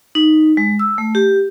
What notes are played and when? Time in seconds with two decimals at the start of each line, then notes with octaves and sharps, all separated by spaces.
0.15 D#4
0.57 G#3
0.79 E6
0.98 A3
1.15 G4